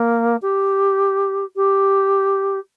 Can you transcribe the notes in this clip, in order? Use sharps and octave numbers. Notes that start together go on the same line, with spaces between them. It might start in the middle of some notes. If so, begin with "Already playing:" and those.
Already playing: A#3
G4
G4